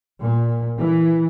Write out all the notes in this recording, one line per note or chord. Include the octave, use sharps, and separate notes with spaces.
A#2
E3